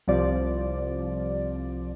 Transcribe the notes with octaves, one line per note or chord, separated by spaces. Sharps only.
C2 F3 D5